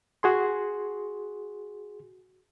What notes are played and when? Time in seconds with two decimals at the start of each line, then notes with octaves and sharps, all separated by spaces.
0.23 F#4 G#4 C6